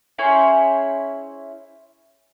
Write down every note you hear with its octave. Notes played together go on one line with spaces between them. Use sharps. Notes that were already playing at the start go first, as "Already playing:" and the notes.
C#4 E4 G#4 C5